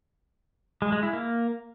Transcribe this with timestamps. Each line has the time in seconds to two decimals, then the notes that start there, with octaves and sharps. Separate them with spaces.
0.82 G#3
0.92 G#3
1.03 E4
1.13 A#3